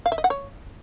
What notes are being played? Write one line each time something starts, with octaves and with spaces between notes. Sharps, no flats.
F5
E5
D#5
F#5
C#5